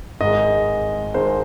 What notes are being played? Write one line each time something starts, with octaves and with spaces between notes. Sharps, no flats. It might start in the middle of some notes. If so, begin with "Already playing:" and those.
G#1 G#2 G#3 D#5
G#1 G#2 G#3 C5